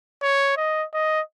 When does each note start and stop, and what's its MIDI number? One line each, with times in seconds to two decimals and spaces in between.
0.23 0.55 73
0.57 0.85 75
0.94 1.21 75